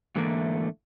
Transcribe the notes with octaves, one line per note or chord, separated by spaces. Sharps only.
G#2 D3 E3 A3 A#3